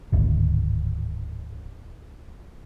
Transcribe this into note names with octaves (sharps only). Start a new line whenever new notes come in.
D1 G#1